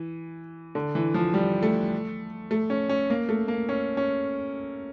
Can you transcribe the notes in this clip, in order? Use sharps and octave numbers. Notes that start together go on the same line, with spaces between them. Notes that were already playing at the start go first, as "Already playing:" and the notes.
Already playing: E3
D3
E3
F3
G3
A3
A3
C#4
C#4
A#3
A3
A#3
C#4
C#4